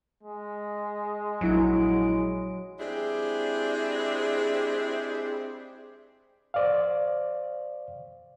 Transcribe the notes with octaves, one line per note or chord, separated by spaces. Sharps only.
G#3
A#1 F#3 E4 D7
G#3 C4 D4 E4 G4 G#4
C5 D5 F5